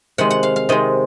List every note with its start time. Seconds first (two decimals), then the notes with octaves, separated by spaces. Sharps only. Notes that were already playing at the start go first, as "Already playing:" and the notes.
0.18 C3 D#3 G#3 F#5
0.30 F#5
0.43 F5
0.56 F5
0.69 C3 D#3 G#3 D#5